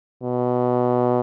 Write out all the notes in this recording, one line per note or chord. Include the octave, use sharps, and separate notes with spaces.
B2